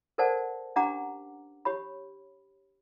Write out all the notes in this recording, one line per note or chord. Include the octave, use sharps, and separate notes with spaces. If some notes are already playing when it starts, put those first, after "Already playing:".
A4 A#4 C5 D5 F#5 A5
C#4 D4 G4 F#5 A#5 D6
G4 C#5 B5